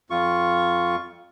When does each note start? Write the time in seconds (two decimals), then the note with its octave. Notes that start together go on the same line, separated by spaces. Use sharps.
0.10 F2 F4 C#6